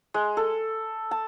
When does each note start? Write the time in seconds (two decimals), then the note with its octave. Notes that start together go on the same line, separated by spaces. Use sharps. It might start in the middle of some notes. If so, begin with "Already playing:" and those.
0.14 G#3
0.37 A4
1.11 A5